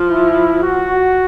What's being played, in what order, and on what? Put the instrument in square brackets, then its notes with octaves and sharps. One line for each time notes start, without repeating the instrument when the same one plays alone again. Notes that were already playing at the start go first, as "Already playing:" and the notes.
Already playing: [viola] F3
[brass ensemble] E4
F#4